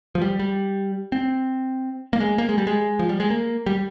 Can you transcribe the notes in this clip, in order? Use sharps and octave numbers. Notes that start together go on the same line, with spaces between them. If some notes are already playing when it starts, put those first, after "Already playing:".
F3
G3
G3
C4
A#3
G#3
A#3
G#3
G3
G#3
F3
G3
G#3
A#3
G3